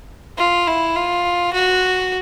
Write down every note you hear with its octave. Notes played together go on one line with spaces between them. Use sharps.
F4
E4
F4
F#4